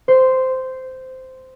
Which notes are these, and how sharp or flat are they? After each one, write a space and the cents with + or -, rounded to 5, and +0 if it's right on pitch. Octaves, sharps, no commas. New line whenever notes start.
C5 -10